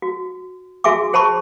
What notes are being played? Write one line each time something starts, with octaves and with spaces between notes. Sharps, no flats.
F#4
F#4 G#4 E5 G#5 C6 D6
G#4 C5 A5 B5 C#6